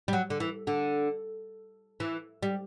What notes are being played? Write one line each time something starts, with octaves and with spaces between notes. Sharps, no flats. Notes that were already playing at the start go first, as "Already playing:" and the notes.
G3
F#3
D3
E3
D3
E3
G3